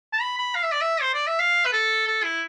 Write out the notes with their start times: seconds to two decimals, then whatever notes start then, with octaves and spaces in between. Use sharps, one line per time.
0.13 A5
0.22 B5
0.38 B5
0.55 F5
0.63 E5
0.72 D5
0.81 E5
1.02 C5
1.14 D5
1.27 E5
1.40 F5
1.65 B4
1.73 A4
2.07 A4
2.24 E4